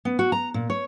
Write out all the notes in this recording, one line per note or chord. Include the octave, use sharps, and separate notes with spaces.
B3
F#4
A#5
A#2
C#5